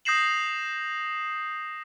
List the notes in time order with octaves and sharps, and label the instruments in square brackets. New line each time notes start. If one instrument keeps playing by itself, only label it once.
[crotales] D#6 G6 A#6 C7 E7 F#7